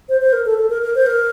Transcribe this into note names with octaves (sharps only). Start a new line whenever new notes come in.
C5
C5
A#4
A4
A4
A#4
A#4
C5
A#4